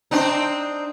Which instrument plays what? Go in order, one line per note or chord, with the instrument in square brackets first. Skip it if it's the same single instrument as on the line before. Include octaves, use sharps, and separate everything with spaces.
[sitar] C4 D4 D#4